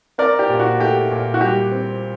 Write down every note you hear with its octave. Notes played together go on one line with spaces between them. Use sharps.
C4 A#4 D5
G4
A#2
F#4
A3 G4
A#2
F#4
G3 G4
C4